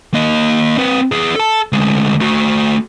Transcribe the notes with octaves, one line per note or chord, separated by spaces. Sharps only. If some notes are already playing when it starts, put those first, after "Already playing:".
A#3 D#5
C4 B4
B3 G#4
A4 A5
D2 G#3
A3 F#4